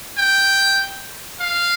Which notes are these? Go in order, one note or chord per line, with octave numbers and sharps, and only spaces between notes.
G5
F5